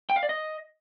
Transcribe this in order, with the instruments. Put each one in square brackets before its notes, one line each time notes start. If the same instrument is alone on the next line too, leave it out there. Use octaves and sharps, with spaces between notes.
[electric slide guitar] G5
F5
D5
D#5